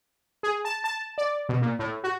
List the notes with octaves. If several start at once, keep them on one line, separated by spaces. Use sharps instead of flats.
G#4
A5
A5
D5
B2
A#2
A2
F#4